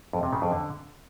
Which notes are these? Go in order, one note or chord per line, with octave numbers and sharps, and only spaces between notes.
F2
C3
C#3
F2
D3